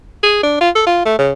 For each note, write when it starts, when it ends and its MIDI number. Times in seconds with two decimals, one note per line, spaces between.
0.23 0.42 68
0.43 0.58 62
0.61 0.70 65
0.75 0.82 69
0.87 1.05 65
1.06 1.19 57
1.19 1.32 49